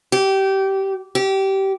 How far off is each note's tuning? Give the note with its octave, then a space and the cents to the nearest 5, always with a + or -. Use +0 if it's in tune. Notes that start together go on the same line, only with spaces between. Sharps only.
G4 -20
G4 -20